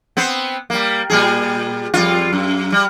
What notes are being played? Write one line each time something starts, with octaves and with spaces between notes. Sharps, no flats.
B3 C4 C5
G3 A#3
A#2 G3 G#4
F2 G3 F4
F#2
G3